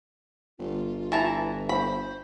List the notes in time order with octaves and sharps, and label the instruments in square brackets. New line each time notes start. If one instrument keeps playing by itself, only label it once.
[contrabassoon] G1 [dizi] F4
[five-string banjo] E3 A5 A#5
[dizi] C5 [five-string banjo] B5